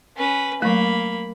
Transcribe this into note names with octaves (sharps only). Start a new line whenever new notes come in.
C#4 B4
F#3 A3 A#3 B5